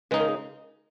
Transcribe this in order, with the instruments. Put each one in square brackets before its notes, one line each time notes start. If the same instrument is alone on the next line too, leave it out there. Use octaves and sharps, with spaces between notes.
[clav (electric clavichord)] C#3 G#3 D#4 [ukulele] B4
[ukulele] A#4
G#4